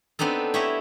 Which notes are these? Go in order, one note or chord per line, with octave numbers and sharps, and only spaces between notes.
B3 C4 D4 D#4 A4
E4 G4 C#5 D#5 E5